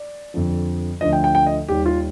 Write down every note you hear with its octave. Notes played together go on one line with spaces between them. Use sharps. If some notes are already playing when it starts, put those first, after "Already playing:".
Already playing: D5
F2 D3 F3
D2 D3 F3 D#5
G5
G5
G5
D#5
D#2 D#3 G3 G4
F4